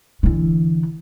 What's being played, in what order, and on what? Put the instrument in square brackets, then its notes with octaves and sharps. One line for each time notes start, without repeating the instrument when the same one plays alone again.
[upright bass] D3 E3